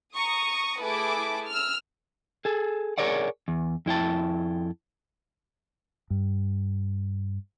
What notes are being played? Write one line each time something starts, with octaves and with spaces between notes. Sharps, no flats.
A#5 C#6 D#6
A3 E4 G#4 B4 A5 D6
E6 F6
G#4 A4
G#4 A#4 C#5 D5 F#5
E2
F2 E4 G5 A5
G2